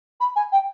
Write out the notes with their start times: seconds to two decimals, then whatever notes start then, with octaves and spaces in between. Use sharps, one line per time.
0.20 B5
0.35 G#5
0.52 G5